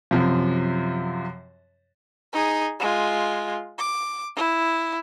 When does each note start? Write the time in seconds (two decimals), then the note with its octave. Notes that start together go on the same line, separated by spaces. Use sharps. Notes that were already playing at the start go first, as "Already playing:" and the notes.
0.11 F#2 C3 F3
2.33 D#4 G#4
2.80 G#3 F4
3.79 D6
4.36 E4